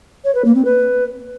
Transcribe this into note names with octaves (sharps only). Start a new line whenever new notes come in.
C#5
B4
A#3
C4
B4